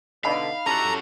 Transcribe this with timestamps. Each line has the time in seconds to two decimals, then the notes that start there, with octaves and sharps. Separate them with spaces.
0.24 B2 D3 D#4 F5 B5
0.66 C#4 E4 F#4 G4 A4 A#5